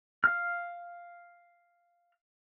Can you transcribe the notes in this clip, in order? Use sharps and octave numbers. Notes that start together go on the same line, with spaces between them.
F5 F6